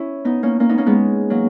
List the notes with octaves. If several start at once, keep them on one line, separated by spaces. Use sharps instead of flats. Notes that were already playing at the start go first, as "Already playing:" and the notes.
Already playing: C#4 E4
B3 D#4
A#3 C#4
A#3 C#4
B3 D#4
A#3 C#4
G#3 B3
F#3 A#3